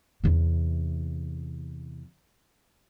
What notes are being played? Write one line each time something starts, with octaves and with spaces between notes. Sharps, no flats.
E2 C3